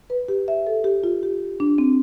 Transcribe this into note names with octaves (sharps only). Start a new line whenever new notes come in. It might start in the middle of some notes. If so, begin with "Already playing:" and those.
B4
G4
E5
A4
G4
F4
G4
D4
C4